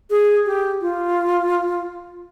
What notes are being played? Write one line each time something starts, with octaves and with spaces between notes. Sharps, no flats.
G#4
G4
F4